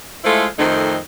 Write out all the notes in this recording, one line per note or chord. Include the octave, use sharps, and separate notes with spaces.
G#3 A3 E4 F4 A4 C5
F2 D#3 A3 C4 D#4